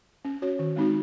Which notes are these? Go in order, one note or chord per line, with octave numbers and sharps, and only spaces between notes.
C#4
F#4 C#5
D#3
G#3 C4 D#4 F#4